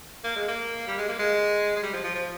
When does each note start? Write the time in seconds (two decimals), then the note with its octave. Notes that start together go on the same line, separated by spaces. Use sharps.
0.24 A#3
0.36 G#3
0.49 A#3
0.87 G3
0.98 G#3
1.09 A#3
1.19 G#3
1.76 G#3
1.83 G3
1.93 F3
2.04 F3
2.15 F3